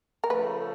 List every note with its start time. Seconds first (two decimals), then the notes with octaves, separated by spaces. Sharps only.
0.24 A#4
0.29 C#3 F3 A3 B4